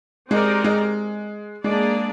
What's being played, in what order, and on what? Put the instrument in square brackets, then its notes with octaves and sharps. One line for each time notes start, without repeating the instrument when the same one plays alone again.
[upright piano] G#3 [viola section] C4 D#4 G4 A#4 D5
[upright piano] G#3
[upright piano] G#3 [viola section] A#3 D4 G#4 D5